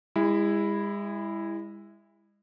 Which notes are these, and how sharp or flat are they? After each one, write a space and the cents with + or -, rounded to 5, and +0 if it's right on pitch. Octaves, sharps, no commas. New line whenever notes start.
G#3 -40 E4 +0